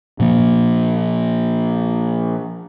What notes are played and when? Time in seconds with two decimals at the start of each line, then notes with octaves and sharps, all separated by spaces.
0.20 A#2 F3 A#3